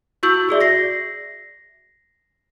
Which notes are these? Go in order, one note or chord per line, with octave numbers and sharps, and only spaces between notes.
E4 F#4 C#6 E6 G6 F#7
F#4 G#4 D5 E5
A#6 C7